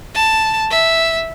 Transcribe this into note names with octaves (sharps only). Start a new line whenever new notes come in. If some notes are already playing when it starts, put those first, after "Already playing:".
A5
E5